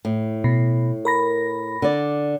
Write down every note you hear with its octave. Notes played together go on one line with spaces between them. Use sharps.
A2
B2
A#4 B5 A#6
D3 D5